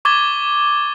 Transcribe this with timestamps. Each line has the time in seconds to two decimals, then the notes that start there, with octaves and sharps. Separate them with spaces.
0.05 C#6 D6 G#6 A6 G7